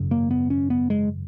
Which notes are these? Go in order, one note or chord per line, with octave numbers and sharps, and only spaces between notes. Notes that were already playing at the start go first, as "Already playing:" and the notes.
Already playing: G#1 F#2 C#3
A#3
B3
C#4
B3
G#3